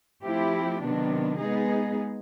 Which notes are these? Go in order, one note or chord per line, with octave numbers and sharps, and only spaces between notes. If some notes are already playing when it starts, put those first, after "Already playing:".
F3 A3 C4 E4 G4
C3 D#3 F#3 B3 D4
G#3 B3 D#4 G#4